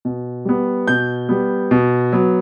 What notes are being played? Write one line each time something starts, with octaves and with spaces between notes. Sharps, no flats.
B2
G3 B3
B2 G6
G3 B3
B2
F#3 B3